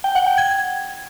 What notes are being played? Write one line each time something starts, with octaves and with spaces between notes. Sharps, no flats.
G5
F#5
G5
G#6